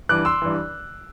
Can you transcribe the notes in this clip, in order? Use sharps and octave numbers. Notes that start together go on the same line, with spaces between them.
G2 E3 D6 F#6
C6 E6
G2 E3